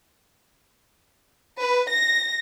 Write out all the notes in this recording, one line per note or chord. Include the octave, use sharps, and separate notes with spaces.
B4
A#6